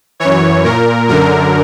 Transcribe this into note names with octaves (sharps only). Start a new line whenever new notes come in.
F#2 E3 C#5
A#2 A#4
F#2 D3 A#4